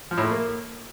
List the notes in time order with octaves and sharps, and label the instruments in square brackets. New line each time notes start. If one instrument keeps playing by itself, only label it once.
[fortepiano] F3
A2
A3
A#3